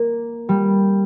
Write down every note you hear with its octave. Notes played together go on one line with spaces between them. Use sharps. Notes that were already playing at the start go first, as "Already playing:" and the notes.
Already playing: A#3
G3